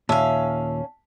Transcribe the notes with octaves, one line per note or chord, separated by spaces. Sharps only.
D#2 A#2 C#4 E5 F5 A5